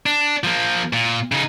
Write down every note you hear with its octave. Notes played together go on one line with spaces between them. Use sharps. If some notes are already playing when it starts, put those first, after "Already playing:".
D4
F3 A#3
A#2
C#3 D#4